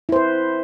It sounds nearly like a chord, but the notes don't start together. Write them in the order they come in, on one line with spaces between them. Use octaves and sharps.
E4 C5 B4